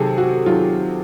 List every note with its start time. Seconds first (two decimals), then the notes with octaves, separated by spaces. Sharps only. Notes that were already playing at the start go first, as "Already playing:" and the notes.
Already playing: C3 D#3 F#3 G#4 A4
0.18 F#4
0.46 D#3 F#3 F4